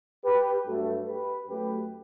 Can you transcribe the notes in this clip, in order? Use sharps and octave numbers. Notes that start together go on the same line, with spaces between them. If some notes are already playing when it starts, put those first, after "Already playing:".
G4 B4
G2 F#3 A3 F#4 A4
G4 B4
F#2 F#3 A3 G4 B4